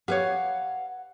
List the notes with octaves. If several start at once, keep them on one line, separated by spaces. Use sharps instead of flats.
G4 B4 C#5 F5 F#5